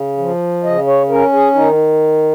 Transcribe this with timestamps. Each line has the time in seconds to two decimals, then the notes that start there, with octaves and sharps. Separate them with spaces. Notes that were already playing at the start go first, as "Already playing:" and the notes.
Already playing: C#3
0.18 F3
0.64 C#3 D#5
0.87 C#5
1.09 C#4 A#4
1.33 G#4
1.55 D#3 D#4